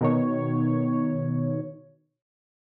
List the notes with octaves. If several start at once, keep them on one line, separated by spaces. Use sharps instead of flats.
B2 D#3 C#5